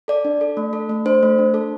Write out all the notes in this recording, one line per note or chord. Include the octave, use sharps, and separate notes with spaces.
A4 D5
D4
A4
A3
A4
A3
D4 C5
A3
D4
A4